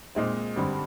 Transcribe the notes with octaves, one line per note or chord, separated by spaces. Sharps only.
A#2 G#3 C4 D#4
G2 D3 G3 C4